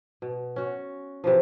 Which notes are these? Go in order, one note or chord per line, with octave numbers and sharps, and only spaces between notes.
B2
C#4 F#4
C3 E3 F3